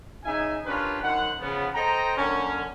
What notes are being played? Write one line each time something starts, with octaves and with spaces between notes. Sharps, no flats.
C#3 D#4 E5 G#5
C#4 D4 F4 G4 A#4 B4
F#2 D#4 C5 F#5
C#3 F3 B3
A4 C5 D#5 G5 A#5
F#2 D3 A#3 C#4